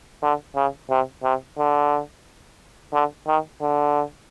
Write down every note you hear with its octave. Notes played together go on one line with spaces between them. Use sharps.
D3
C#3
C3
C3
D3
D3
D#3
D3